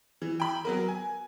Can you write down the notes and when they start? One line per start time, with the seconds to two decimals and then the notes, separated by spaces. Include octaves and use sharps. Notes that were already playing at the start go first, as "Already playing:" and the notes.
0.22 E3
0.40 G5 B5
0.65 F#3 B3 A#4
0.88 G#5